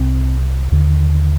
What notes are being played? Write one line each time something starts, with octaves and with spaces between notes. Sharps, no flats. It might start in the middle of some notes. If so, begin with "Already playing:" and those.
Already playing: C2 C3 C4
D#2 D3